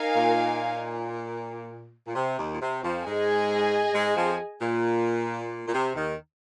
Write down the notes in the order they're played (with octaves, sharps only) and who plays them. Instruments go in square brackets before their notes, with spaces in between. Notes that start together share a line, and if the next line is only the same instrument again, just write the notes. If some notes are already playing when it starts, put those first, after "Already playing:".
Already playing: [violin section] D#4 A#4 F5 G#5
[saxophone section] A#2
A#2
C3
D#2 D#3
A#2
C3
F2 F3
[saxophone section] G#2 G#3 [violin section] G#4 D#5 G#5
[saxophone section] G#2 G#3
F2 F3
A#2
A#2
C3
D#2 D#3